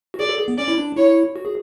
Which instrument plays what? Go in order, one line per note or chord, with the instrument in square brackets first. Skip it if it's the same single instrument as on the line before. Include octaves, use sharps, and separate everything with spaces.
[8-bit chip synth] F#4
[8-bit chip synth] G#4 [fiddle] D5
[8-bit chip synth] A4
G#4
B3
[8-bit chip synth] C#4 [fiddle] D5
[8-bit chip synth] E4
D4
[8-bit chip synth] E4 [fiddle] C#5
[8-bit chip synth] F#4
G#4